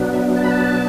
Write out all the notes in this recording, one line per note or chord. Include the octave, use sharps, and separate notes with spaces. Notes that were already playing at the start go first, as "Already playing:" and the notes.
Already playing: B2 F#3 B3 D4
E5
A5
B5
A5